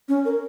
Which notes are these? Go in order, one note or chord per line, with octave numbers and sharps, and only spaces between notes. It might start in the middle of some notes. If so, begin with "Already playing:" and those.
C#4
A#4